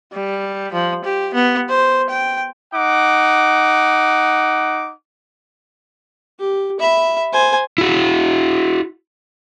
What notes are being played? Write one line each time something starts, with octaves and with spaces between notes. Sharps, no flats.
G3
F3
G4
B3
C5
G5
D#4 F#5 D6
G4
E5 B5
C5 G#5
E4 F#4